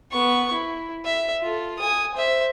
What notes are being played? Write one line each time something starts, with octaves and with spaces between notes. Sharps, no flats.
B3 C#6
E4
E5
F4 A4
G#5 D#6
C5 E5